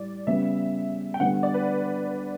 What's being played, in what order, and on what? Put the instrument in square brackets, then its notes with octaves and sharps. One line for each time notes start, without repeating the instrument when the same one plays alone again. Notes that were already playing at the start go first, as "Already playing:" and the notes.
Already playing: [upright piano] A2 G3 [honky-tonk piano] D5
[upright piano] C#3 G3 B3 [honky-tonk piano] E5
[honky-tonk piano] G5
[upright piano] D3 G3 B3 [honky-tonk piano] F#5
[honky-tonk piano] D5
B4